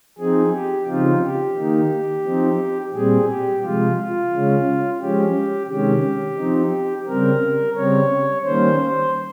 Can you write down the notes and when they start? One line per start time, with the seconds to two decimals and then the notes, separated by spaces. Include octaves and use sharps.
0.19 F3 C4 D#4 G#4
0.53 G4
0.87 C#3 F3 C4 D#4 F4
1.23 G4
1.57 D#3 A#3 D#4
2.25 F3 C4 D#4
2.94 A#2 G3 C4 G#4
3.28 G4
3.63 C3 F3 G#3 F4
3.97 F4
4.32 C#3 G#3 C#4
5.01 F3 G#3 C#4 G4
5.69 C3 D#3 G#3 C#4 G4
6.38 F3 C4 D#4
7.07 C#3 G3 C4 A#4
7.76 C#3 G3 C4 C#5
8.45 D#3 G3 A#3 C#4 C5
8.79 C5